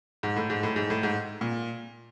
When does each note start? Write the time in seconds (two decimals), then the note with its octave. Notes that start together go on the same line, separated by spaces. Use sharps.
0.23 G#2
0.36 A2
0.50 G#2
0.63 A2
0.76 G#2
0.90 A2
1.03 G#2
1.41 A#2